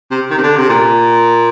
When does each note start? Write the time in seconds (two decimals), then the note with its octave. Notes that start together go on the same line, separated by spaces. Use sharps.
0.11 C3
0.31 D#3
0.38 C3
0.43 D3
0.57 C3
0.69 A#2